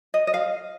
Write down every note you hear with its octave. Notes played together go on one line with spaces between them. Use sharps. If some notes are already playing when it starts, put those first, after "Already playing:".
D#5
D#5
F5